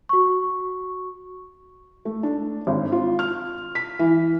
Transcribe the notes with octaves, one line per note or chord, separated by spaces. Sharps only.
F#4 C#6
A3
D4
G#1
F4
F6
B6
E3